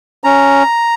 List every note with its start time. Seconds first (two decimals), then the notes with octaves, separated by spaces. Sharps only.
0.24 C#4 A#5